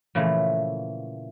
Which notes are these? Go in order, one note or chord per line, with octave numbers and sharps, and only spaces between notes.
A#2 C#3 E3 F3 A3